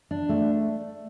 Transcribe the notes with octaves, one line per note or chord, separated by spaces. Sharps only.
D4
A3